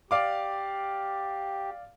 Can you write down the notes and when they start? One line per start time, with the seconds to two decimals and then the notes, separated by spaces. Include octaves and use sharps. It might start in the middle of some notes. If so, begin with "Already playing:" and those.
0.11 G4 D5 F5 D6